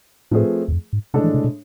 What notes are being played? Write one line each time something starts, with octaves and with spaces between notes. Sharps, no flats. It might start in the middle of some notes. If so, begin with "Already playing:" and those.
A2 F3 A3 C4 G#4 B4
E2
F2
G#2
A2 C3 G#3 D4 A4
E3
C3
B2